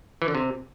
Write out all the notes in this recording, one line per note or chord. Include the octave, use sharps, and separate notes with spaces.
E3
D3
C3